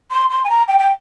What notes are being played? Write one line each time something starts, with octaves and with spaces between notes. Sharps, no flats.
C6
C6
G#5
A#5
G5
G5